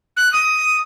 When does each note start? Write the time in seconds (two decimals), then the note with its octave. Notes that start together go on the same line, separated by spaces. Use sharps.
0.17 F#6
0.33 D#6